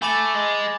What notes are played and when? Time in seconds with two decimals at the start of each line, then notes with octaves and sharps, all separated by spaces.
0.02 A3 G#5 B5 D6 A6
0.34 G#3